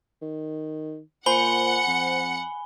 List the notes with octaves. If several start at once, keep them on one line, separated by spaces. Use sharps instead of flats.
D#3
A#2 C5 F#5 G#5 B5 C#7 G7
F2